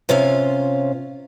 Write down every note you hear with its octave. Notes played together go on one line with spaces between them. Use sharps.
C3 C#4 F4 F5